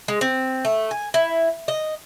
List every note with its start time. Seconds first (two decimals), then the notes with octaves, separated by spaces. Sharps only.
0.08 G#3
0.21 C4
0.65 A3
0.91 G#5
1.14 E4
1.68 D#5